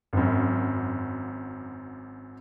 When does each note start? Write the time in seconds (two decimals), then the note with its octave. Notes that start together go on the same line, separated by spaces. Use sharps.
0.13 G#1 F#2